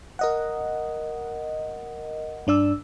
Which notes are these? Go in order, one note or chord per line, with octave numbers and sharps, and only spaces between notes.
A#4 D#5 F#5
G2 D4 D5 E6